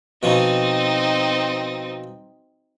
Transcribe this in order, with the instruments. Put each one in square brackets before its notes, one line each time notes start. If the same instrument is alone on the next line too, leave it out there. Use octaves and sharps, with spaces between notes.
[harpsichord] B2 F3 C#4 [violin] C4 D#4